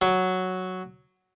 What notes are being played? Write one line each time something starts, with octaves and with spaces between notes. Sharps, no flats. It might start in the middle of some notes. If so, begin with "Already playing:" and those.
F#3